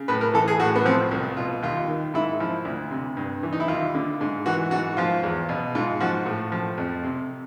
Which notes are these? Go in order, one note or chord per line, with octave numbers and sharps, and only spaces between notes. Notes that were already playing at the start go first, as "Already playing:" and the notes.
Already playing: C#3
A2 B4
A#4
E3 A4
G#4
A2 F#4
B3
F3 C4
C2
B2 F4
D#2 F4
D#3
G#2 E4
F3 E4
D2
C3
G2
E3
D#4
E4
D#2 F4
D3
G#2
E3 F#4
G#2 F#4
F3 F4
E2
B2
G#2 F4
F3 F#4
A2
F3
F2
C3